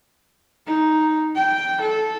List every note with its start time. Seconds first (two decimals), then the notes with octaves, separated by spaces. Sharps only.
0.67 D#4
1.36 G5
1.81 A4